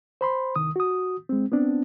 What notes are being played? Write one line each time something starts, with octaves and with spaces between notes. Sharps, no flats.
C5 B5 C6
C2 D#3 D#6
F#4 D#6
G#3 C4
B3 C4 D4